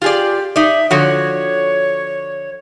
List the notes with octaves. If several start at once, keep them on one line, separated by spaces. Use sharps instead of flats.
F4 G4 G#4 D5
D#4 D5 E5
D3 F3 F#4 C#5